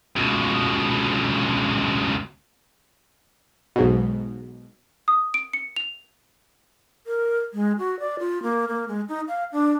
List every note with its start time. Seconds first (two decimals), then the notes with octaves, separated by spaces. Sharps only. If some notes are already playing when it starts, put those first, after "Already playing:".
0.16 C#2 B2
3.76 B1 G#2 B2
5.08 D#6
5.34 D7
5.53 C#7
5.76 F7
7.07 A#4
7.54 G#3
7.79 F#4
8.00 D5
8.19 F4
8.43 A#3
8.68 A#3
8.88 G#3
9.09 D#4
9.28 F5
9.52 D4